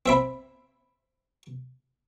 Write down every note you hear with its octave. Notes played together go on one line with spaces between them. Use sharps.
C4 E5 B5